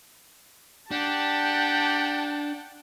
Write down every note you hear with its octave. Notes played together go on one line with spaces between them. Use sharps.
D4 G4 F#5 G5 A5